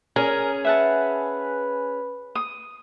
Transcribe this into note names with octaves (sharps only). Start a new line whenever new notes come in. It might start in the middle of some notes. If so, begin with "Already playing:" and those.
C#4 G#4 A#4
B4 E5 F#5 A5
D#6